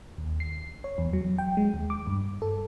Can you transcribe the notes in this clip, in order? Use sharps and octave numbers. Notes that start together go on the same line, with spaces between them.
D#2
C7
C#5
E2
F#3
G5
G#3
D#2
D6
G2
A4